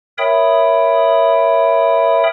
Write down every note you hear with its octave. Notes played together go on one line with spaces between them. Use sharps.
A#4 C#5 E5 G5 B5 D#6